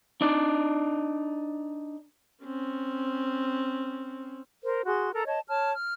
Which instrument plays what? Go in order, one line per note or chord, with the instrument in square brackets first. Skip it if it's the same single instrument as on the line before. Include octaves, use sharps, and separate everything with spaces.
[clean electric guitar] D4 D#4 D5
[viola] C4 C#4
[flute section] A#4 C5
F#4 G#4 C6
A4 A#4 A#5
C#5 D#5 A5
C#5 A5 F6
F6